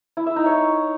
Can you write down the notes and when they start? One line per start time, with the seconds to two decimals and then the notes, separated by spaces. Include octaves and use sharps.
0.17 E4
0.27 E5
0.36 D#4
0.46 C#5